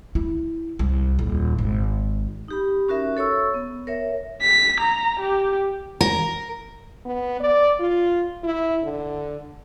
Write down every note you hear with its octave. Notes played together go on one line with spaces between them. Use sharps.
E4
C2
D#1
G#1
D#4 G4 B5
C#4 F#4 A#4 E5
A4 C#5 C#6 E6
B3
A#4 C#5 E5
B6
A#5
G4
A#4
B3
D5
F4
E4
D3